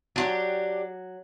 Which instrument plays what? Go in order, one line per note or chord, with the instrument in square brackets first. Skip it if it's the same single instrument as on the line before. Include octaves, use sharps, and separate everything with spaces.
[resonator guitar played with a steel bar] F#3 [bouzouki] D4 F4 G4